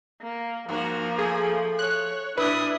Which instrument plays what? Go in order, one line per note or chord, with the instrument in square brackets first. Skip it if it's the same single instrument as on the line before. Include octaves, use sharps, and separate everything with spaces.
[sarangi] A#3
[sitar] G2 F#4 [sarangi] F3 [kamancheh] A#3
[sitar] A3 [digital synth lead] G#4
[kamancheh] C#5 [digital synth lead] F#6
[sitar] A#2 [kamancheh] D4 D#6 [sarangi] E4 [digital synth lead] B4